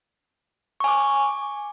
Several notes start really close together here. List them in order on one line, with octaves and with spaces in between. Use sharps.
C#6 G#5 D6